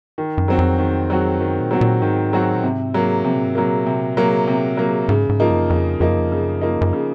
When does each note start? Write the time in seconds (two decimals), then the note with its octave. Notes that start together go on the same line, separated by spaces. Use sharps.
0.18 D#3
0.38 F#2
0.48 F#3 C4 F#4
0.58 F2
0.78 D#3
1.10 F#3 C4 F#4
1.40 F#2 D#3
1.61 A#2
1.71 F#3 C4 F#4
1.81 A#2
2.02 G#2 D#3
2.33 F#3 C4 F#4
2.55 A#2
2.63 G#2 C3
2.94 F#3 A#3
3.24 C3 F3
3.36 A#2
3.45 G#2
3.55 F#3 A#3
3.65 A#2
3.86 C3
4.17 F#3 A#3
4.47 C3
4.77 F#3 A#3
5.09 G#2 C#3
5.29 G#2
5.40 F3 A#3 D#4
5.50 F#2
5.70 F2 C#3
6.00 F2 F3 A#3 D#4
6.09 F#2
6.18 F2
6.31 F#2 C#3
6.61 F3 A#3 D#4
6.81 F#2
6.93 C#3